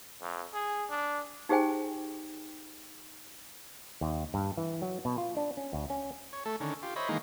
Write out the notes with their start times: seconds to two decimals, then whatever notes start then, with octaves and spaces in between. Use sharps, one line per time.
0.21 F2
0.54 G#4
0.90 D4
1.49 D#4 G4 G#4 C5 G5 G#5
4.01 D#2
4.34 G2
4.58 E3
4.82 F#3
5.05 B2
5.18 F4
5.37 D4
5.57 C#4
5.73 D2
5.90 C#4
6.33 C#5
6.45 A3 A4
6.60 D3 D#3 C#4
6.83 F4 G4
6.96 C5 C#5 D#5 E5 B5
7.09 D#3 E3 G#3 A#3 D#4